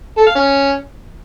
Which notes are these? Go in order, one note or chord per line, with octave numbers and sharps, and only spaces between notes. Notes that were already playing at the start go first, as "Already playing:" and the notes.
A4
F5
C#4